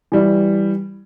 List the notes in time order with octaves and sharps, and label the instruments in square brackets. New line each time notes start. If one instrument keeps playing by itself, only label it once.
[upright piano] E3 G3 E4